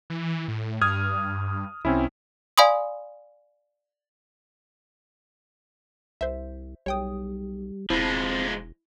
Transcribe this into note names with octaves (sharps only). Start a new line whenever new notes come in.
E3
A2
G2 D#6 F6 G#6
C2 C4 C#4 E4
D5 F5 G#5 B5 C6 D#6
C2 C5 E5
B1 G3 C#5 G5 D#6
E1 F3 G#3 C4 E4 A5 B5